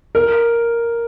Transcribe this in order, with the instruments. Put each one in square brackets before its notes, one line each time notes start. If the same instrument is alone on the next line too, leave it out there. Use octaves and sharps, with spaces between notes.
[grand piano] A#4